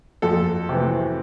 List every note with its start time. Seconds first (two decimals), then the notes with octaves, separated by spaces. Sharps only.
0.22 F2 A4
0.69 C3 E3